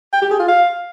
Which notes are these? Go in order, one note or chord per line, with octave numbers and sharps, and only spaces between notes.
G5
G4
G#4
F4
F5